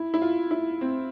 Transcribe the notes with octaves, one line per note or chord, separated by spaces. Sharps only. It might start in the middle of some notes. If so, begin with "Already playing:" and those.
Already playing: E4
E4
F4
E4
C4